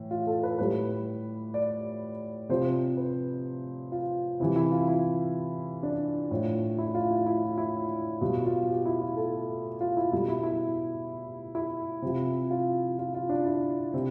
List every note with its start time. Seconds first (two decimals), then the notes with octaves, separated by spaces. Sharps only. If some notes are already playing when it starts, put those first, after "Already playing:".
Already playing: A2 E3
0.11 F4
0.27 A4
0.43 B4
0.58 A2 G3 B4
1.54 D5
2.49 C3 F3 C5
2.97 B4
3.92 F4
4.40 C3 E3 G3 E4
4.56 E4
4.72 F4
4.88 E4
5.83 D4
6.31 A2 F3
6.78 E4
6.94 F4
7.11 E4
7.26 E4
7.42 F4
7.58 E4
8.21 B2 G3 F4
8.45 F4
8.69 G4
8.86 E4
9.01 F4
9.17 A4
9.81 F4
9.97 E4
10.12 B2 G3 E4
10.28 E4
10.43 E4
11.55 E4
12.02 C3 F3
12.51 F4
12.99 F4
13.14 F4
13.29 D4
13.46 E4
13.94 C3